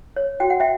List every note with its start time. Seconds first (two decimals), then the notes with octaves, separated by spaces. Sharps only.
0.16 C#5
0.40 F#4 G5
0.50 F#5
0.60 E5 G5